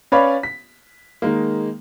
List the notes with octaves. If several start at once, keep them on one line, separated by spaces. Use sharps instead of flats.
C#4 B4 C#5 D5 F5 B5
B6
D#3 G#3 A#3